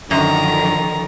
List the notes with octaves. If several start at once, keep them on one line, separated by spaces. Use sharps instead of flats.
F#2 D3 D#3 F3 A#5